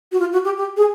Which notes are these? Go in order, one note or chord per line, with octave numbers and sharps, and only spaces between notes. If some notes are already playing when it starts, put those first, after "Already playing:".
F#4
F4
F#4
G4
G4
G#4